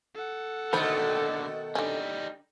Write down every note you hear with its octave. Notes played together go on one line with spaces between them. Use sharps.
A4 F#5
B2 D3 D#3 A3 A#3 C5 B5
D3 G3 C#4 D#4